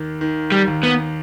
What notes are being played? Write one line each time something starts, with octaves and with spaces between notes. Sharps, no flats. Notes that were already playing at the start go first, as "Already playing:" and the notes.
Already playing: D#2 D#3
D#3
G3
D#2
B3